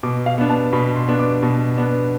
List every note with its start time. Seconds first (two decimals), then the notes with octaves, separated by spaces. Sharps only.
0.03 B2 D6
0.26 F5
0.38 B3 D4
0.50 A5
0.73 B2 B5
0.96 C6
1.08 B3 D4
1.19 D6
1.43 B2
1.77 B3 D4